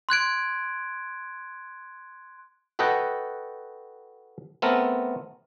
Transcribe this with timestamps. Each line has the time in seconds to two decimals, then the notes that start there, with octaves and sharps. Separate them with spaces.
0.09 C6 F#6 G#6 D7
2.79 F#4 A4 B4 D#5 F#5 G5
4.62 A3 B3 C4 A4 A#4